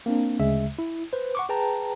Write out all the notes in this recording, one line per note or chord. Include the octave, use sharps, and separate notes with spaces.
A#3 C4 D4
D2 C#3 G#3 E5
E4
B4 C5
F#5 C#6 D6
G#4 B4 G5 A5 A#5